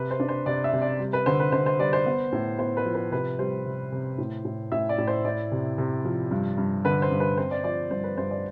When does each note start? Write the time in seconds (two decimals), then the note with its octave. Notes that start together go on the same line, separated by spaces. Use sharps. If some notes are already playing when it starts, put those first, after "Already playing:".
Already playing: C3 B4
0.11 C5
0.20 D4
0.29 C5
0.46 C3 D5
0.64 E5
0.73 C3
0.81 D5
1.00 G3
1.13 B4
1.26 D3 C5
1.40 B4
1.52 D3 C5
1.66 C5
1.79 G3 D5
1.93 C5
2.06 B3
2.33 A2
2.59 B3 C5
2.77 B4
2.85 F3
2.95 B4
3.12 C3 B4
3.39 G3 C5
3.65 C3
3.92 C3
4.18 A2
4.45 A2
4.72 A2 E5
4.89 D5
4.98 A2
5.07 C5
5.25 E4 D5
5.52 C3
5.78 C3
6.05 F3
6.31 G2
6.58 G2
6.84 D3 B4
7.02 C5
7.11 G2
7.20 B4
7.37 C4 C5
7.51 D5
7.64 F3 D5
7.91 G2 C5
8.04 B4
8.17 G2 C5
8.31 D5